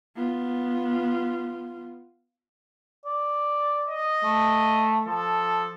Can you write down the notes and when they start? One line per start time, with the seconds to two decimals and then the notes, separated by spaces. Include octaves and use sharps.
0.16 B3 F4
3.05 D5
3.86 D#5
4.24 A3
5.07 F3 A4